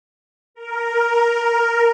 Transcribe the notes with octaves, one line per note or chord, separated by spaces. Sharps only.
A#4